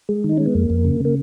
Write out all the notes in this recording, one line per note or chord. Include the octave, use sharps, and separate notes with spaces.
G#3
D#3
D#4
G#3 C#4
B3
F2 A#3
F2
C#3
C#3 A#3